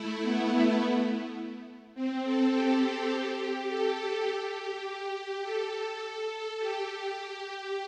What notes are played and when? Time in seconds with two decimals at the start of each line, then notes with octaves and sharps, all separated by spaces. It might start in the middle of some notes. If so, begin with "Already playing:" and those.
Already playing: A3 E4
0.22 B3
1.94 C4
2.24 A4
2.53 G4
3.68 A4
4.26 G4
5.43 A4
6.58 G4
7.16 G4